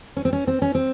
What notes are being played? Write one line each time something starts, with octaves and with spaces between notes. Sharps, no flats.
C#4
C4
C#4
C4
C#4
C4